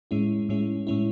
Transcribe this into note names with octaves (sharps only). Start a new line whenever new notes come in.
A2 G#3 C#4 E4
A2 G#3 C#4 E4
A2 G#3 C#4 E4